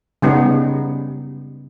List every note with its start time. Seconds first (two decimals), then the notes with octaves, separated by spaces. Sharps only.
0.22 C#3 G3 B3 D#4